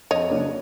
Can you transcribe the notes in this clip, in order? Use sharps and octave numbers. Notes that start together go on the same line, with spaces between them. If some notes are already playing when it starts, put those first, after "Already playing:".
F2 C#5 D#5
C#3 F#3 A#3 D4